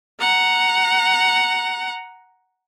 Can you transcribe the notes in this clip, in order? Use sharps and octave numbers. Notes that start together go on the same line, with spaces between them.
F#5 A#5